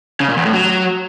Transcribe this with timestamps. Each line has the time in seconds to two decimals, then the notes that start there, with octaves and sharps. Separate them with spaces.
0.20 C#3
0.29 A#2
0.37 E2
0.45 A2
0.54 F#3